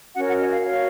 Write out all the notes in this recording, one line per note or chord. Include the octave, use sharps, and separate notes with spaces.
C#4 F#4 A#4 C#5 F#5
F#5
D#5
F5
F#4 A#4 C#5 F5